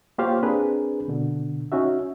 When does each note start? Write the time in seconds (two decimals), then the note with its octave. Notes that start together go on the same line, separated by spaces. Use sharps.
0.18 A#3 F4 G4 C5 C#5 F5
0.43 C4 D4 G#4 A#4 B4
1.08 B2 D3
1.72 C#4 D#4 F#4 E5